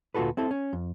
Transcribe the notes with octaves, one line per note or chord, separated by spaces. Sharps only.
D2 A#2 F4 F#4 A4 B4
C4 E4 A4
C#4
F2